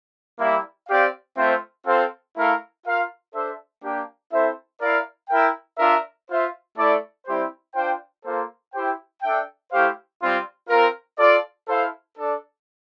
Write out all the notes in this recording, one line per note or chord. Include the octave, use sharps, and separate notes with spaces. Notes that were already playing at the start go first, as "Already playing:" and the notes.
G3 A#3 E4
C4 G4 D5 F5
A3 C4 F4 C5 E5
C4 F4 A4 C5 F5
A3 E4 A#4 F5
F4 A#4 F5
D4 A4 C5 E5
A#3 D4 G4
C4 E4 A4 C5 E5
E4 A#4 D5 F5
E4 A#4 E5 G5
D4 F4 A#4 E5
F4 C5 E5
A3 E4 A4 D5
G3 C4 E4 G4 C5
D4 F4 C5 G5
A#3 F4 A4 C5
E4 G4 C5 G5
D4 A4 E5 G5
A3 E4 G4 C5 F5
G3 C4 F4
C4 F4 A#4
F4 A4 D5
E4 A4 C5 F5
D4 A4 D5